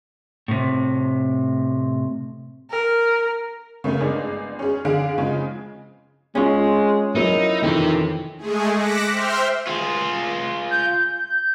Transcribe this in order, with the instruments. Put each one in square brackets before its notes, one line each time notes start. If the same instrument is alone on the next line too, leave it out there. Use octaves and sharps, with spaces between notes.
[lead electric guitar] A2 C3
[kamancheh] A#4
[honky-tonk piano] C#3 A3 A#3 C#4
G1 G#3 D4 G#4
C#4 G#4
D3 G#4 F5 D7
C#3 F3 G#3
[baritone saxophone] G#3 [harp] C#4 F4
[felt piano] F#3 A#4 D#5 [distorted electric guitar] D#4 [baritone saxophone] E4
[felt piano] F2 D#3 E3 [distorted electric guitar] C4 G4
[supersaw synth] G#3 A3 G#4
D6 F#6 A#6 B6 C#7 E7
C5 E5 G5 C6 F6
[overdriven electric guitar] F4 G#4
[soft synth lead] G6